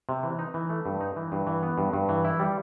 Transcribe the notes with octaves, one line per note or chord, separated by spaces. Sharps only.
C3
E3
D#4
E3
A3
G2
D#4
E3
G2
E3
B3
G2
G2
E3
E4
G3